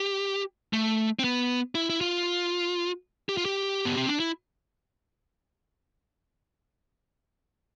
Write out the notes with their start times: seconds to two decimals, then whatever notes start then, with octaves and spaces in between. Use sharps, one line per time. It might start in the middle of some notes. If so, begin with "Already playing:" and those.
Already playing: G4
0.73 A3
1.19 C4
1.24 B3
1.75 E4
1.90 E4
2.01 F4
3.29 G4
3.37 F4
3.45 G4
3.85 B3
3.97 C4
4.08 D4
4.20 E4